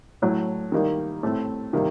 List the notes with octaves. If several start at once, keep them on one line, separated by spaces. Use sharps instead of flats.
A2 F#3 A3
D#3 G3 A#3 D#4
A2 A3 C4
C3 D#3 G3 A#3